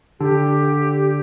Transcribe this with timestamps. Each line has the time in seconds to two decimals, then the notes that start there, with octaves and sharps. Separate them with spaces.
0.21 D3 G4